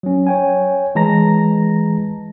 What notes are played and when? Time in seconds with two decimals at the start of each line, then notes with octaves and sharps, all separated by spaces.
0.03 F#3 C#4
0.27 C#5 G5 G#5
0.95 E3 G#3 A5 A#5 A#6